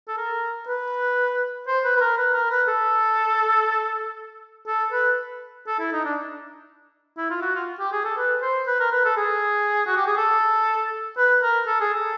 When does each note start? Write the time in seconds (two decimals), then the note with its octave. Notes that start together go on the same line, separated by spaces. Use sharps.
0.08 A4
0.18 A#4
0.68 B4
1.68 C5
1.84 B4
1.97 B4
2.01 A#4
2.18 B4
2.34 A#4
2.51 B4
2.68 A4
4.67 A4
4.92 B4
5.67 A4
5.79 E4
5.93 D#4
6.05 D4
7.17 E4
7.30 F4
7.42 F#4
7.55 F4
7.79 G4
7.92 G#4
8.05 A4
8.17 B4
8.42 C5
8.67 B4
8.80 A#4
8.92 B4
9.05 A4
9.17 G#4
9.86 F#4
9.96 G4
10.07 G#4
10.17 A4
11.17 B4
11.43 A#4
11.67 A4
11.81 G#4
11.95 A4